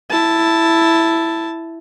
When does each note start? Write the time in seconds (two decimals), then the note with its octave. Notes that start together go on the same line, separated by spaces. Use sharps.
0.10 E4 A5